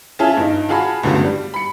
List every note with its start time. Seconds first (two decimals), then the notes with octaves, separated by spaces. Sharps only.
0.19 C#4 F4 G#4 E5 A5
0.37 G2 D#4
0.69 F4 F#4 G#4 F5 A5 B5
1.03 C#2 G2 D3 F#3 A3 B3
1.24 G3
1.54 B5 C#7